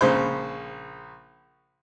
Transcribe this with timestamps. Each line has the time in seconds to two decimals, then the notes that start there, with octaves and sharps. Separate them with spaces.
0.01 A#1 C#3 C5